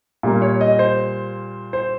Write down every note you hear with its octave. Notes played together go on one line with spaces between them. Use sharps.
A#2 G3 A#3
C#5
D#5
C5
C5